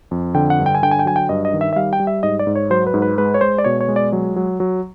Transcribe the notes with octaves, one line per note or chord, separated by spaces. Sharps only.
F2
D3 G5
F#5
G2
G5
G#5
D3 G5
G#5
G5
F#3 G#5
G5
G2 D#5
D#5
D#3
E5
E5
G3 F5
G5
G3
E5
G#2 D#5
D5
G#2
C#5
F#3 C5
B4
G#2
B4
G#3 B4
C#5
G#3 C5
D5
B2 C#5
C#5
G#3
D5
F#3
F#3
F#3